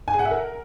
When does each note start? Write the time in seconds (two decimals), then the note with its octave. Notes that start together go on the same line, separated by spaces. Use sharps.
0.08 G#5
0.13 G#4
0.19 F#5
0.25 E5
0.31 A#4